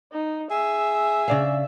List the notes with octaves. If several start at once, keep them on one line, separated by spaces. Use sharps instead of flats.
D#4
G#4 E5
C#3 D5 F5